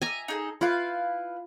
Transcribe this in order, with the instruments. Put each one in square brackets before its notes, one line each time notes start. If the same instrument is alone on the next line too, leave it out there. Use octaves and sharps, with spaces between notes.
[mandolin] D#5 E5 [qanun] G#5 A#5
[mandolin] D#4 G#4 A4
[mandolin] E4 B4 F5 [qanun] F4